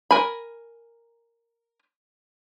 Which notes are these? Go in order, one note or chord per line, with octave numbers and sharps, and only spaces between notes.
A#4 G#5 B5